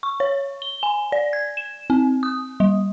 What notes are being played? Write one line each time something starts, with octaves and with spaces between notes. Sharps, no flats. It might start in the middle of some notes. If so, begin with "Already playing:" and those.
C#6
C#5
G7
G#5
D5
G#6
E7
C4
D#6
G3